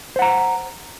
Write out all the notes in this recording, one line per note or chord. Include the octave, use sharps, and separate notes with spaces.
C5 F#5 A#5